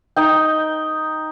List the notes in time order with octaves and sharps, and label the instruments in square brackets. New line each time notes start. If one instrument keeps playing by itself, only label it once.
[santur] D#4 G5